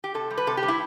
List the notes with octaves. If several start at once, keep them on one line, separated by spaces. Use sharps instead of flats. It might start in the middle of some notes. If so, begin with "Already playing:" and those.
G4
C3 A4
G3
B4
C3 A4
G4
G3
E4